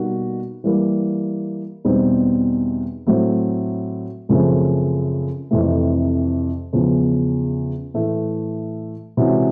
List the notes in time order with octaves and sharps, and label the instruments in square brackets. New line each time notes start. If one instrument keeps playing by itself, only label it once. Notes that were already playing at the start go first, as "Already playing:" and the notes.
Already playing: [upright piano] B2 G3 A#3 D#4 F#4
E3 G3 A#3
E2 B2 G3 C4 D#4
A2 F#3 A3 C4
F#2 C#3 F3 A3 C4
F2 C3 E3 A3
E2 C#3 F3
A2 E3 A3
C3 E3 G#3 C#4 F#4